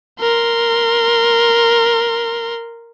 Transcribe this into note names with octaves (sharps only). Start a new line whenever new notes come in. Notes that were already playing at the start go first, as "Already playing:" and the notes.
A#4 C6